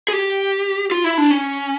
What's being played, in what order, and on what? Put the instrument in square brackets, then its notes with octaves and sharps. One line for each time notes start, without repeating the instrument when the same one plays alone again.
[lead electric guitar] G#4
G4
F4
E4
D4
C#4